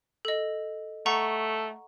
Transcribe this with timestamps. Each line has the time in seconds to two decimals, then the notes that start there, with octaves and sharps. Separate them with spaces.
0.25 A4 D#5
1.06 A3 F#5 A#5 C#6